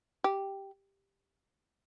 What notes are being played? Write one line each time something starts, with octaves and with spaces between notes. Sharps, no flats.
G4